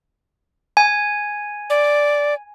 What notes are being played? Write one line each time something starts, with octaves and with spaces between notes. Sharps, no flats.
G#5
D5